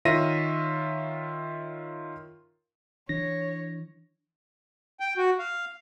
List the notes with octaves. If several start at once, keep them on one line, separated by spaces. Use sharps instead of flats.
D#3 F4 C#5 E5 A#6 D#7
E3 D4 C#5 A#6
G5
F#4
F5